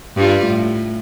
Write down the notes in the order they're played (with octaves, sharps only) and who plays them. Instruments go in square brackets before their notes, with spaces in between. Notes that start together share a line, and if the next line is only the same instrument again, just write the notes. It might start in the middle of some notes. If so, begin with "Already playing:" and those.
[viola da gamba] G2 G3 F4
A2